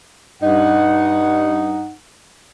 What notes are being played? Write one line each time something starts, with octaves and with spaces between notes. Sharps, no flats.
G2 D#4 F#5